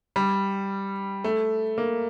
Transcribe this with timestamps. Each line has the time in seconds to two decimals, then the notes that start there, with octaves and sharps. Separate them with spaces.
0.16 G3
1.24 A3
1.78 A#3